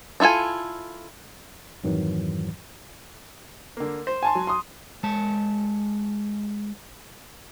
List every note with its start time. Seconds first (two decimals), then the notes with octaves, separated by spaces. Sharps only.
0.20 D4 E4 F4 A4 G#5
1.84 F2 G#2 D#3 E3 F#3
3.77 D3 A#3
4.07 C5
4.23 G#5 A5 C6
4.35 F#3
4.47 C6 D#6
5.03 G#3 C#5 A5